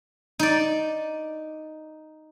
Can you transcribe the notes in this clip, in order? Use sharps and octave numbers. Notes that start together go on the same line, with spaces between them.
D#4 D5